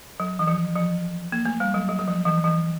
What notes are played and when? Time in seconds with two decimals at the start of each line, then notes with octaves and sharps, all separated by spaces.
0.20 F#3
0.39 E3
0.47 F3
0.76 F3
1.32 A#3
1.46 A3
1.60 G3
1.74 F#3
1.89 F#3
1.99 F#3
2.08 F3
2.25 E3
2.44 E3